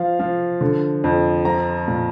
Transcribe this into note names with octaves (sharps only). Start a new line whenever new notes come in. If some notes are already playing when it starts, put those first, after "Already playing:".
Already playing: F3 F5
F3
D3
F2
F3 A#5
A#2